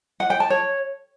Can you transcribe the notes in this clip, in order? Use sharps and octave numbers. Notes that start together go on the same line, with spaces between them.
F#5
G5
A5
C#5